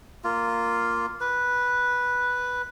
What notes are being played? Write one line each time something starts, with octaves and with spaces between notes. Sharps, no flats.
A#3 F4
B4